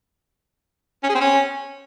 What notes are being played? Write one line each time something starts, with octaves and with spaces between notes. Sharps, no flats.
C#4
G#4
C4
C#4